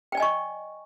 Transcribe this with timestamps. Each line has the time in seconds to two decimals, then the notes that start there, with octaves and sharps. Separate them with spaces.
0.12 G5
0.15 D5
0.17 G#5
0.20 D#5
0.22 C#6